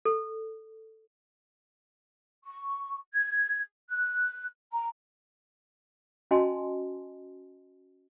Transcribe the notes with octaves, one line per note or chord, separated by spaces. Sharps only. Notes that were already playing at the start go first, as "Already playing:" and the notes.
A4
C#6
G#6
F#6
A#5
C#4 F#4 D#5 G#5 A5 C6